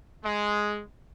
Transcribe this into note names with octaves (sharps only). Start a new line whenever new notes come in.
G#3